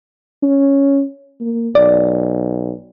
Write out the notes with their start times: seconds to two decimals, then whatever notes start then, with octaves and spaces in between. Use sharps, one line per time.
0.43 C#4
1.41 A#3
1.75 B1 D5